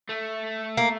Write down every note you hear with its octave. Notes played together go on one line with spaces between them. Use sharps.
A3
A#3